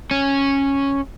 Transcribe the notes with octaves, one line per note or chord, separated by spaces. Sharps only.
C#4